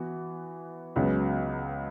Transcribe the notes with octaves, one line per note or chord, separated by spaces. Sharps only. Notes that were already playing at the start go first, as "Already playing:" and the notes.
Already playing: E3 B3 F#4
C#2 C#3 F#3 B3